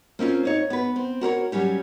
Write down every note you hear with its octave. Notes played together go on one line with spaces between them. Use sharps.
A#3 C4 C#4 F4
D#4 C#5
B3 B4
C4
F#4 A#4 C5 C#5
F#3 G3 C#4 G4